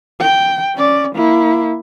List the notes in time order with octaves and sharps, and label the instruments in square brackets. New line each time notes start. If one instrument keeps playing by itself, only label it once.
[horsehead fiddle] G5
C#4 D5
A#3 E4